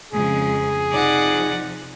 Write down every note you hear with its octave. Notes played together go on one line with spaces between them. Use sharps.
F2 C#3 G#3 G#4
C3 F3 D#4 D5 F#5